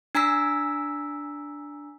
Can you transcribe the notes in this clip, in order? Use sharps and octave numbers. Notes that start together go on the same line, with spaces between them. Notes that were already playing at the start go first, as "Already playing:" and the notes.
D4 G#5 A#5 E6 B6